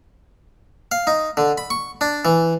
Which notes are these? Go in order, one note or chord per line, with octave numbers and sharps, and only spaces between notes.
F5
D#4
D3
B5
C#6
D4
E3